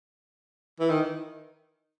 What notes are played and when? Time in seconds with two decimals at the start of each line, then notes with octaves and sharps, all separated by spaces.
0.80 E3
0.90 D#3